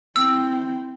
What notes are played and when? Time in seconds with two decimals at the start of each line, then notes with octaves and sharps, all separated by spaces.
0.16 C4 E4 E6